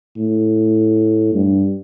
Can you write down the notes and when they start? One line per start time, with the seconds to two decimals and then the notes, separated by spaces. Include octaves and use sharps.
0.17 A2
1.34 G2